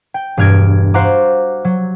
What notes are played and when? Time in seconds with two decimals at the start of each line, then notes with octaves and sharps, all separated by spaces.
0.14 G5
0.37 E1 G2 F6 G#6 D7
0.94 F#4 C5 F5 F#5 A#5 D6
1.65 F#3